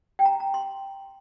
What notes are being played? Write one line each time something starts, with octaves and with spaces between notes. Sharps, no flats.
G5
A#5
A#5
C6